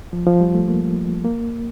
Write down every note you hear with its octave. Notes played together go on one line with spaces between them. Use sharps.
F3
F3
G3
A3
A#3
A#3